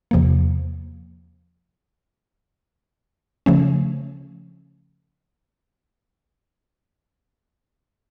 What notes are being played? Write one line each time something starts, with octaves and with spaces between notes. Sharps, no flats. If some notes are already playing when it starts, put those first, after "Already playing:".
E2 C3 F3 A#3
C#3 F3 A3 C#4